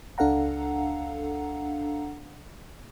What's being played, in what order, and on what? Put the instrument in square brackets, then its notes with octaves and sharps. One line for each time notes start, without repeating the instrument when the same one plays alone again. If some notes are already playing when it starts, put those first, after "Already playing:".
[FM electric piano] C#2 D4 A4 F5 F#5 A#5